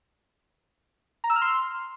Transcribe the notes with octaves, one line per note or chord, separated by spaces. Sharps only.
A#5
E6
F6
C6